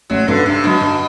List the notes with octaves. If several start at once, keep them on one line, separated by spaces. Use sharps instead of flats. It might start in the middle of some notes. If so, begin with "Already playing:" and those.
A1 F#3
G2 D3 F#3 B3
G2 C3
B2 D3 F#3
G2